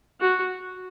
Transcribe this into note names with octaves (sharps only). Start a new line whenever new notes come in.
F#4